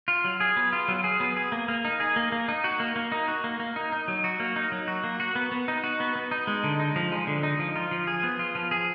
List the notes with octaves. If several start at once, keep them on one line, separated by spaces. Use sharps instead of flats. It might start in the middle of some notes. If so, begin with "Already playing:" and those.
F4
F#3
G#4
B3
F4
F#3
G#4
B3
G#4
A#3
A#3
D#4
G#4
A#3
A#3
D#4
F#4
A#3
A#3
D#4
F#4
A#3
A#3
D#4
D#4
F#3
F#4
A#3
D#4
F#3
F#4
A#3
F#4
B3
B3
D#4
F#4
B3
B3
D#4
G#3
D3
D#4
F3
G#3
D3
D#4
F3
F4
F3
G#4
B3
F4
F3
G#4